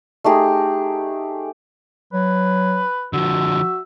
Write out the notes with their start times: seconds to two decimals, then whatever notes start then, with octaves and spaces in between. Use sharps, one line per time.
0.24 A3 D#4 G4 G#4
2.13 F#3 B4
3.13 D3 F3 F#4 E5